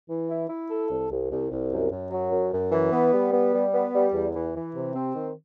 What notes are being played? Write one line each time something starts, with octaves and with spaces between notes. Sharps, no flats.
E3
E4
E4
A4
C2
C2
C2
C2
F#2
F#2
F#3
F#2
F#2
E3
B3
G3
B3
G3
B3
G3
E2
E3
E3
C3
C4
D#3